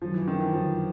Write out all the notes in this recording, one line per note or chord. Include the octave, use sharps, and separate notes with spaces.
F#2 D#3 F3 F#3
E3
D#3
E3
F2 D3 F3 F#3